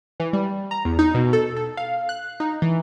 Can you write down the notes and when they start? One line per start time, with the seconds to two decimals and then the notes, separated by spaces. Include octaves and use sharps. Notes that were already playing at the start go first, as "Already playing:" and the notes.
0.20 E3
0.33 G3
0.71 A#5
0.85 E2
0.99 D#4
1.14 B2
1.33 A4
1.57 A4
1.77 F5
2.09 F#6
2.40 D#4
2.62 E3